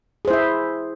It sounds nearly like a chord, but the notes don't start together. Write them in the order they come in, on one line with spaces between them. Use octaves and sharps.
G#4 C5 E4 E5